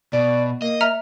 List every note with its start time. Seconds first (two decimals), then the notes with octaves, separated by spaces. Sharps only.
0.13 B2 D5
0.62 A#3 D#5
0.81 E5 A#5 F6